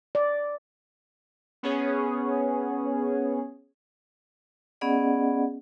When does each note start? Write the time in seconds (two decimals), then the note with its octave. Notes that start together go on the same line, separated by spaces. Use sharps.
0.15 D5
1.63 B3 C#4 G#4 C#5
4.81 B3 C#4 G#4 D5 D#5 F#5